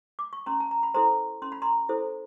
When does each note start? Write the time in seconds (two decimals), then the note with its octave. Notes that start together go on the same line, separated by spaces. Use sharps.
0.19 D6
0.33 C#6
0.46 C#4 A#5 C6
0.60 A5
0.71 A#5
0.83 B5
0.94 E4 A4 C5 A#5 C6
1.42 C#4 C6
1.52 B5
1.62 A#5 C6
1.89 E4 A4 C5